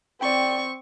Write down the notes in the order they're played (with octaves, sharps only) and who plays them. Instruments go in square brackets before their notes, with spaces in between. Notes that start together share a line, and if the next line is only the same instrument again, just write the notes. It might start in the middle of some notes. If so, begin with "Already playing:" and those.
[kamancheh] C4 C#6 [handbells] D5 G5